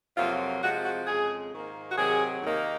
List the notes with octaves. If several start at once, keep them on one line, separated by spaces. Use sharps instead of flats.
F2 C3 F#3 A#3 F4
C3 F3 G#3 F#4
F#4
F2 C#3 G#3 G#4
G#2 D#3 A#3
F#4
C3 D#3 F#3 G#4
D#2 D#3 A#3